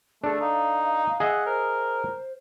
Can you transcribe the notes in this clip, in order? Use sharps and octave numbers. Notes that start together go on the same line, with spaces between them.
A3 D4 G#4 A4
D#4 F5
G#4 D#5 E5 F#5
A#4 C5